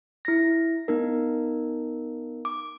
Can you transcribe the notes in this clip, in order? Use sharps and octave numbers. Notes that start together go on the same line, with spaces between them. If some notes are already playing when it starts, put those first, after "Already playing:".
E4 A#6
B3 D#4 A#4
D6